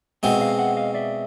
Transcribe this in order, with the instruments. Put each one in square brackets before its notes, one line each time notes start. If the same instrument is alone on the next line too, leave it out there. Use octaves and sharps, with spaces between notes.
[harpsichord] B2 G#3 C4 [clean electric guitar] E5 F#5
[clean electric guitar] D#5 F5
E5 F#5
D#5 F5
D5 E5